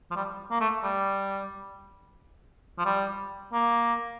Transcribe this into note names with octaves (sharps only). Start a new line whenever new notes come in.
F3
G3
A#3
A3
G3
F3
G3
A#3